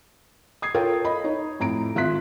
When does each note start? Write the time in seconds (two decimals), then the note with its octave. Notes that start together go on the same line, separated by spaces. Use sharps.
0.62 D#6 G#6 C7
0.74 F4 A4 A#4 C#5 G5
1.05 D#5 B5
1.24 D#4 C#5
1.60 F2 A2 A#5 D7
1.95 G#1 F4 E5 C6 F#6 B6